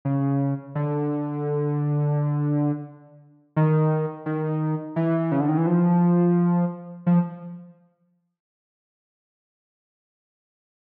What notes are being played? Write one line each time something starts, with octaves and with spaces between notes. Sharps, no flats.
C#3
D3
D#3
D#3
E3
C#3
D3
D#3
E3
F3
F3